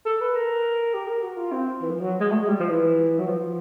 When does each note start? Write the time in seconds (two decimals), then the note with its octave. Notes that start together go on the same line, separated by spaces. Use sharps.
0.06 A4
0.21 B4
0.35 A#4
0.94 G4
1.08 A#4
1.23 F#4
1.37 F4
1.52 C4
1.82 E3
1.91 F3
2.01 F#3
2.20 G#3
2.31 A3
2.39 G#3
2.49 G3
2.60 F3
2.70 E3
3.19 F#3
3.27 F3